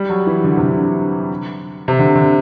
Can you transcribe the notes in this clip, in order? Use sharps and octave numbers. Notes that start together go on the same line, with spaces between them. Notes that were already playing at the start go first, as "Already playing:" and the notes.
Already playing: G3
F#3
E3
D3
C3
D3
C3
D3
D3